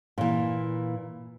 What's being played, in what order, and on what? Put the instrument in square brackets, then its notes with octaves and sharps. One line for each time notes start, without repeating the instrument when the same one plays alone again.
[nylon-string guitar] A#2 E3